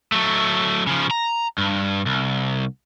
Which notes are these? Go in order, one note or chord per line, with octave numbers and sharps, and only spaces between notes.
F#3 A3
C#3 F3
A#5
G2
C2